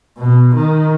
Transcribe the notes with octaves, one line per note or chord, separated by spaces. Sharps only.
B2
D#3